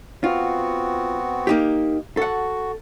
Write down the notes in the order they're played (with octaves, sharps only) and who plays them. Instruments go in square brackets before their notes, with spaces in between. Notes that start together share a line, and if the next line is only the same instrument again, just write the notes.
[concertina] B3 C4 F#4 [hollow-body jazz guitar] F4
[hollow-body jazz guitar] A#3 D#4 G4
[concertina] F#4 [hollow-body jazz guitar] A4 F#5